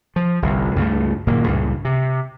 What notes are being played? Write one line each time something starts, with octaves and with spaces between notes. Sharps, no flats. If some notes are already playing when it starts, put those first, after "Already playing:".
F3
G1 C2
C#2 G2 F3 A3
F#1 A#2 D#3 A#3
C#2 G2 A#2 C#3
C3